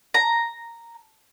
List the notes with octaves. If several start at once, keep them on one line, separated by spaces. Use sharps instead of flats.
A#5